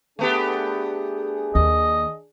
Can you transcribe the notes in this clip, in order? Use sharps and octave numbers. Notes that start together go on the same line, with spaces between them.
A3 B3 D4 G4 G#4
D#2 A#3 D#5